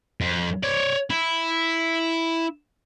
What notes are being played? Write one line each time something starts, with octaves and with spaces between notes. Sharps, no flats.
F2
C#5 D5
E4